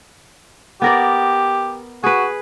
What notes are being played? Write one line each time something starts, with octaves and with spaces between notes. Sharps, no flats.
B3 G4 A#4 D5
F#4 G#4 B4